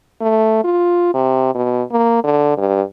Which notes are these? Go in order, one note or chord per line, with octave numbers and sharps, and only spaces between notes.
A3
F4
C3
B2
A#3
D3
G2